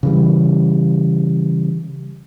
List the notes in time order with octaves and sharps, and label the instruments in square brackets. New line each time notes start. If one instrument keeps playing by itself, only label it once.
[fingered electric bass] C#3 E3 G3